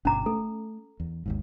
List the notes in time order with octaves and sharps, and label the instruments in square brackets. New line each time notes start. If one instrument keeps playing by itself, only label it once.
[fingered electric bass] G1 B2 [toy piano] C#4 A#5 D6
[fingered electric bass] A3 [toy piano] A4
[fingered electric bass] E2
G#1 D#2 G#2